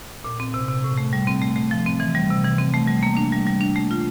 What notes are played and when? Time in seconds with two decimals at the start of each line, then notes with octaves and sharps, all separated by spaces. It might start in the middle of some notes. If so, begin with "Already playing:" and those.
0.24 A#2
0.40 C4
0.54 C3
0.69 C3
0.84 A2
0.98 A3
1.13 G3
1.27 C4
1.42 A3
1.56 A3
1.71 F3
1.86 C4
2.00 E3
2.15 G3
2.30 C3
2.45 E3
2.58 C4
2.74 A3
2.87 G3
3.03 A#3
3.17 D4
3.32 G3
3.47 G3
3.61 D4
3.76 A3
3.91 F4